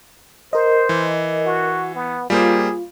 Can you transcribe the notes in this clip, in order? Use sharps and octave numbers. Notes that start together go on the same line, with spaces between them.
A#4 C5 D#5
E3
F#4
B3
G3 A#3 F4 G#4 C5